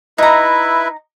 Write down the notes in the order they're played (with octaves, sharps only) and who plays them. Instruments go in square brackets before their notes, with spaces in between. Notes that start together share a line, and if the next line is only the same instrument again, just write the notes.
[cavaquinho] D#4 A#5 [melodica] E4 B4 E5